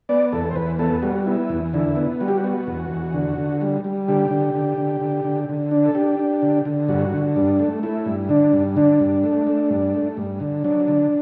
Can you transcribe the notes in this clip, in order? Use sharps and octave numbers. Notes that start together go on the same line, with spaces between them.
B3 D5
E2 A4
C5
E2 B4
B3 A4
G3 F#4
B3 E4
E2
D3 E4
B3
G3 F#4
G4
F#4
B3
E2
E2
D3
D3
G3
G3
D3 G4
D3
D3
D3
D3
D3
D3
D4
A4
D4 G4
D4
D3
D3
G2 F#4
D3
G2 D4
A3
A3 E4
G2
D3 D4
G2
D3 D4
G2
A3
A3
G2
A3
G2
D3
F#3 D4
D3